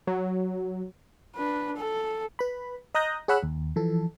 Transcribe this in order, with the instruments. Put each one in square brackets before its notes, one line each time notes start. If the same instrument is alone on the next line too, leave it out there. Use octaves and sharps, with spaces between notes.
[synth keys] F#3
[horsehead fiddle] D4 B4
A4
[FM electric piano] B4 B5
D#5 A#5 D#6 F#6 G6 A#6
G#4 C#5 F#5 B5 E6 F#6
D#2
E3 F3 A4